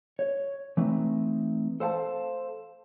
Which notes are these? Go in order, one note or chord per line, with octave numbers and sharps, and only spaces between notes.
C#5
E3 A3 C4 D#4
A4 C5 F5 F#5 A5